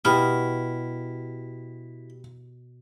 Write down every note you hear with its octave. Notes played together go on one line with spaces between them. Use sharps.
B2 E4 G4 G5 B5 F6